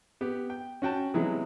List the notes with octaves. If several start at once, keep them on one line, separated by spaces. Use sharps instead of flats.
B3 G4
G5
C#4 F#4 G5 A5
C3 E3 F#3 G#3 B3 E4